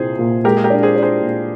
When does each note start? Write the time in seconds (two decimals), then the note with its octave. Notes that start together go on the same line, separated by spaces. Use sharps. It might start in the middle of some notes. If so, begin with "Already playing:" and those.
Already playing: C2 A#2 C4 G#4 C5
0.19 A#2
0.44 G#3 G4 A#4
0.57 G#4
0.64 G4 A#4
0.70 D4
0.83 G#4 C5
0.96 D4
1.02 G#4 C5
1.21 A#2